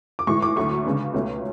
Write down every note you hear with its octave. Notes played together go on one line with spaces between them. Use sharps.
D6
A2 E3 G#3 C#6
D6
D2 D3 F#3 A3 C#6
C#3 G#3 B3 D4
C#2 B2 A3 C#4